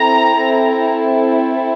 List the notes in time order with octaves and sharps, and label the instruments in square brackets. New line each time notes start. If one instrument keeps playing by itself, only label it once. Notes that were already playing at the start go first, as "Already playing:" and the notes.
Already playing: [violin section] C4 E4 A4 A#5